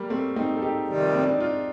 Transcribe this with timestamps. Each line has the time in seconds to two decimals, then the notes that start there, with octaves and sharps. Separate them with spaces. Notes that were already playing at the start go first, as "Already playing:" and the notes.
Already playing: G3 A#3
0.10 A3 C4
0.36 C4 D#4
0.57 A4
0.62 D#4 G4
0.88 F2 C3 D#3 G3
1.14 C4
1.23 D4
1.31 D#4
1.40 D4 F4